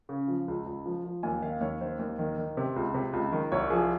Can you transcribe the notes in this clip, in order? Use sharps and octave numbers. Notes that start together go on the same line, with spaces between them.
C#3
F3
C#2
C#2
F3
F3
D#2 G#5
D#3 F5
D#2 C#5
D#3 C5
D#2
D#3
D#3
C3
C#2
C3
C#2
D#3
C2 C#5
F3 G#4